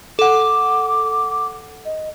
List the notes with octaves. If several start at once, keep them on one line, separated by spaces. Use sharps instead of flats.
A4 F#5 D6
D#5